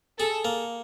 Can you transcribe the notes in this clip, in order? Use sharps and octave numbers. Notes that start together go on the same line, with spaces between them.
G#4 A4
A#3